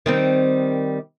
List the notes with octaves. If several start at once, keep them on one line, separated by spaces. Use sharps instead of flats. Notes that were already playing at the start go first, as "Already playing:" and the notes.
D#3 G3 C4